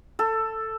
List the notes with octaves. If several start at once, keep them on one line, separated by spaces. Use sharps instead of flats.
A4